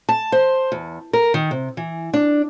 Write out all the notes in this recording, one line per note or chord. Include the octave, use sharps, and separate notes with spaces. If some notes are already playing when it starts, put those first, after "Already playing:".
A5
C5
E2
A#4
D#3
C3
E3
D4